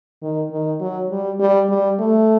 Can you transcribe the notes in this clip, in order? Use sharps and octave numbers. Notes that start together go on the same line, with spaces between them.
D#3
D#3
F#3
G3
G3
G3
A3